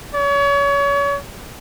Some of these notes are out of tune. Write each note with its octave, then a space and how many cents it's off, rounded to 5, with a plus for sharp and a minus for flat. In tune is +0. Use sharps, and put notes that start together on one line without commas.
C#5 +35